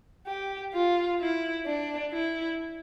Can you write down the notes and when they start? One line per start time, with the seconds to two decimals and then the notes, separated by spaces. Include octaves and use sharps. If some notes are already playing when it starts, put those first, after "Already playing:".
0.26 G4
0.74 F4
1.20 E4
1.66 D4
2.12 E4